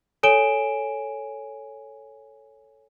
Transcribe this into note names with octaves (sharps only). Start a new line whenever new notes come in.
A4 C#5 G#5 D7 E7 G7